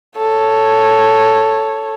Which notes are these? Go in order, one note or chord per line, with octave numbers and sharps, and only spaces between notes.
A4 C#5